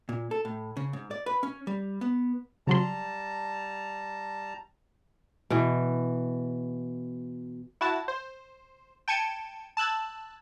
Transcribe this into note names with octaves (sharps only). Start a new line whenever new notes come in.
A#2
A4
A2
C#3
G#2
D5
B4
C#4
G3
B3
C#3 F#3 G3 A5 A#5 C6
B2 E3
E4 F#4 A5
C5
G5 A5 G#6 C#7 D#7
A5 E6 F#6 G#6 A6